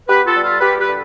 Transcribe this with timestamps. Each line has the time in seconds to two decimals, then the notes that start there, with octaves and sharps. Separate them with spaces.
0.08 B3 G4 B4
0.26 F4 A4
0.36 G3
0.43 F4 A4
0.61 G3 G4 B4
0.79 G4 B4
0.88 D3